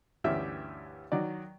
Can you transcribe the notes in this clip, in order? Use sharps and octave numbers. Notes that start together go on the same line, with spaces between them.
D2 G2 E3 C#4 G4 E5
D#3 F#3 D5